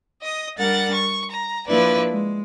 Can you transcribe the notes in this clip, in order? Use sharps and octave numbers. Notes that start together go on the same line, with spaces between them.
D#5 D#6
G3 D4 A#4 F#5 A6
C#6
A#5
F3 A#3 D4 E4 B4 D5
G#3